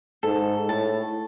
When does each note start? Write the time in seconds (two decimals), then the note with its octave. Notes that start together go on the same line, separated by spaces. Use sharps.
0.23 G#2 A4
0.69 A2 A5